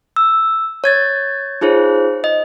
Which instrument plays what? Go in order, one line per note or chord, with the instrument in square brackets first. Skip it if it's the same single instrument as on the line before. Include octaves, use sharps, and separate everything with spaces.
[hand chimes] E6
C#5 G#6 A6
D#4 F4 G#4 C5 C#5
D#5